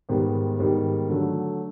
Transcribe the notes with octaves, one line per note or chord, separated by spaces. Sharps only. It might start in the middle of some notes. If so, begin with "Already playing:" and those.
G#2 D#3 G3 B3
G#2 D#3 G3 B3
D3 F#3 A3